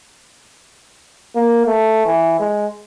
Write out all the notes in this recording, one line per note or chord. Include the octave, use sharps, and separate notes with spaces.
A#3
A3
E3
G#3